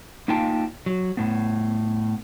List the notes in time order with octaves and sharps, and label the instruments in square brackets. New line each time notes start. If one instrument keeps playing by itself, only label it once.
[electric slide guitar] A#3 D#4 F4 F5 G5 A5
F#3
A2 B3